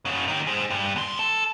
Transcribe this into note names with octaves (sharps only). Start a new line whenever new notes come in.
F#2 C#3
D#4 G4
G#4 C5
G2
D#2 C6
A4